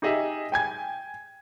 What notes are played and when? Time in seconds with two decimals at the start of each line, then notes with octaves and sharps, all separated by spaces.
0.02 D#4 G4 G#4 D#5 E5
0.52 G5 G#5 G#6